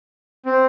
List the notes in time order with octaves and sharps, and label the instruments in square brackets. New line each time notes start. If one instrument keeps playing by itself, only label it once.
[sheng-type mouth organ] C4